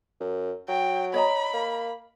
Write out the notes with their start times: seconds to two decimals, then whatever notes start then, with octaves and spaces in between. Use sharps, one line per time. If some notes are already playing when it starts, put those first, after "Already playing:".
0.20 F#2
0.69 F#3 G5
1.14 C#5 D#5 A#5 B5
1.54 A#3